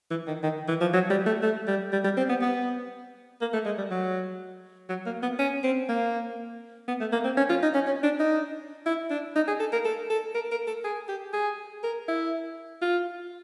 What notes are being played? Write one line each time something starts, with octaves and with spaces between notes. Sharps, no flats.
E3
D#3
D#3
E3
F3
F#3
G3
A3
A3
G3
G3
G3
C4
B3
B3
A#3
A3
G#3
G3
F#3
F#3
A#3
B3
C#4
C4
A#3
B3
A3
A#3
C4
C#4
F4
D#4
C#4
C#4
D4
D#4
E4
D4
D#4
G#4
A4
A#4
A4
A4
A#4
A#4
A4
G#4
G4
G#4
A#4
E4
F4